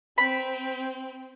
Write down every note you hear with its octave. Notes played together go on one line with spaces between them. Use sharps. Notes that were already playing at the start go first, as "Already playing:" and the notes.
C4 B5